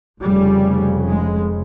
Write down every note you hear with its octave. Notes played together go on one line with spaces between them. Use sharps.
F1 F2 C#3 G3
G#3